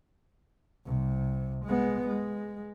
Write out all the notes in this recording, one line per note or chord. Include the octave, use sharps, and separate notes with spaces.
C2 C3
G#3 B3
G#3